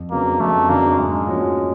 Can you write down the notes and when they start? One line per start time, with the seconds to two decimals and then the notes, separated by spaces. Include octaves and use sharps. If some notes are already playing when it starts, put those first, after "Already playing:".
Already playing: F2
0.11 C#3 F#3 A#3 B3 D4
0.40 F2 A3
0.69 C#3 F#3 A#3 B3 D4
0.98 G#2 G#3
1.26 F3 A#3 C#4 F#4